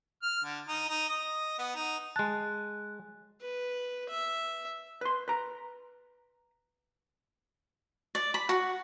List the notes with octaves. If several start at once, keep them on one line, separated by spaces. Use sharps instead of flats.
F6
D3
D#4
D#4
D#5
B3
D#4
G#3 A5 F#6
B4
E5
B4 C6
B4 A#5
D5
B5
F#4